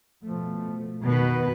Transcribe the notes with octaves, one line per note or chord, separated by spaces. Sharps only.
B2 F3 A3
F2 B2 D#3 B3 B4